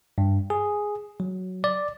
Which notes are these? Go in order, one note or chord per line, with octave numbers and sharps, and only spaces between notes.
G2
G#4
F#3
D5